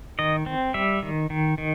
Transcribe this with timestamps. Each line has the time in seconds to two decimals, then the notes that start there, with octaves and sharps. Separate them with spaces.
0.19 D#3 D#5
0.46 C4
0.74 G3 E5
1.03 D#3
1.30 D#3
1.58 D#3